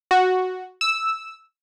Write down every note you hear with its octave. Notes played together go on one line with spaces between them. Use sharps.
F#4
E6